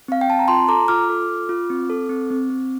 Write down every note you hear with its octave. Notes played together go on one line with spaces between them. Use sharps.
C4 F5
G5
C4 A5
A#5
F4 A5 C6
A4 A#5 D6
F4 D6 F6
A4
F4
F4
C4
A4
C4
C4
C4